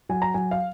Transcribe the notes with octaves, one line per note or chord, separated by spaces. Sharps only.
F#3 G#5
A#5
F#3 G#5
F5